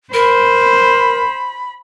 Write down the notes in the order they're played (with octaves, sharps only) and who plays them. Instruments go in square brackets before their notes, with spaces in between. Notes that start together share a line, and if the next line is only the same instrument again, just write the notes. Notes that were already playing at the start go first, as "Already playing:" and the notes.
[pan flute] A#4 [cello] C5 [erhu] B5